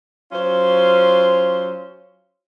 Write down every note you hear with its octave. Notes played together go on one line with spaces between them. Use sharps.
F#3 C#4 F4 C5